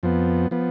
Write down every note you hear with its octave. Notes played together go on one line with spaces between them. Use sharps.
F2 F3 B3
F3 B3